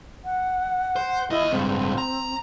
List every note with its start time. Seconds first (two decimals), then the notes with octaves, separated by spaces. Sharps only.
0.24 F#5
0.96 C5
1.30 D#2 E4 D#5
1.51 C#2 G2 C4
1.98 A#5